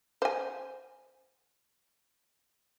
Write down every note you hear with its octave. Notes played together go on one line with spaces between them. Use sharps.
C5 G#5